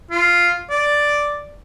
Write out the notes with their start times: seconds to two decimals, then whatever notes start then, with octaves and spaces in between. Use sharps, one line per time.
0.11 F4
0.70 D5